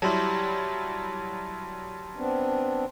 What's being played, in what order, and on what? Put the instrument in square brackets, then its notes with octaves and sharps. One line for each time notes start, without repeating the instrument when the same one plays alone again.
[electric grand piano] F#3 G3 E4 [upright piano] G4 [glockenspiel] A5 C6
[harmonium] B3 C4 D4